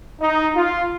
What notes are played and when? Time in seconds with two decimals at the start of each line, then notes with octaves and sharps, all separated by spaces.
0.20 D#4
0.56 F4